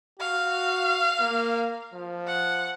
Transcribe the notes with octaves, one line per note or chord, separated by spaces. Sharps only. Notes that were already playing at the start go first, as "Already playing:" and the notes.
F#4 F5
A#3
F3
F#5